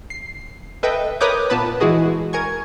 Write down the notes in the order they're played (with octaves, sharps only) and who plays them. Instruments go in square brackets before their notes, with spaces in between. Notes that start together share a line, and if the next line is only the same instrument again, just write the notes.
[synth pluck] C7
A4 B4 D#5 E5 G5
A#4 B4 C#5 D6 D#6 G6
A#2 B3 B4 A5 B5
E3 G#3 E4 F#4 G#4 D#5
A#4 G#5 C#6 G#6